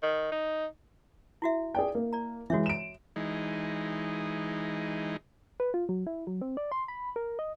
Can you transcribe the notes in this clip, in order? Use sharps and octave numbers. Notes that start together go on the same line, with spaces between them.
D#3
D#4
E4 F#4 E5
G#4 D5 G5
A#3
D5 A#5
E3 G#3 F#4 C#5 E5
D7 E7
E3 G#3 D#4
B4
F4
F#3
E4
F#3
C4
D5
C6
B5
A#4
D#5